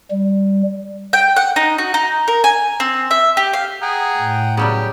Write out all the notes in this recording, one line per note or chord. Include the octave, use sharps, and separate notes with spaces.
G3
G5
F#5
D#4
F#4
D#4
A#4
G#5
C4
E5
G4
F5
G#4 F#5 G5 A#5
A2
C#3 F#3 G3 B3 G4